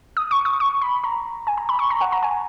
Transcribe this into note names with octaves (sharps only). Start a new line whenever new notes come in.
D#6
C#6
D#6
C#6
B5
A#5
G#5
A#5
B5
C#6
A#5
F#5
A#5
G#5